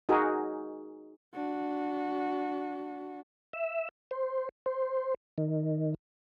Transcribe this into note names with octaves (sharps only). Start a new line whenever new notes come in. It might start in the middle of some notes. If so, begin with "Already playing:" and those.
D#4 F#4 G#4 A#4
D4 F#4
E5
C5
C5
D#3